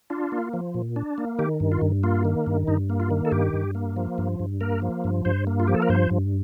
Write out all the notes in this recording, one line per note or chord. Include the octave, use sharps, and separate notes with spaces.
D4 F4
A#3
F3
A#2
D4
A#3
D#3 G4
G2
F4
G2
A#3 F4
D#3
G2
G2 D#4
A#3
F4
D#3
A4
G2 G4
G2
A#3
F3
G2
G2
A#3 A#4
F3
G2
G2 C5
A#3
F4
F3 G4
A4
A#4
G2 C5
G2